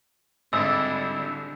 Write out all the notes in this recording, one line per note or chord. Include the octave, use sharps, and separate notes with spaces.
G#1 D3 G3 D4 E4 E6